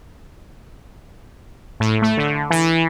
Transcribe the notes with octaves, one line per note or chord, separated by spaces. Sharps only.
A2
A3
D3
E3